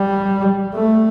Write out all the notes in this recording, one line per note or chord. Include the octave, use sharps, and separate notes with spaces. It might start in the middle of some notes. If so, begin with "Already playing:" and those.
Already playing: G3
A3